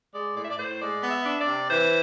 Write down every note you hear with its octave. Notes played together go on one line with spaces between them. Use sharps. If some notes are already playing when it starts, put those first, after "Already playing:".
G#3 D5
A2 D5
E5
D5
A2 C5
G#3 D5
B3
E5
D4
D5
C3
E3 C5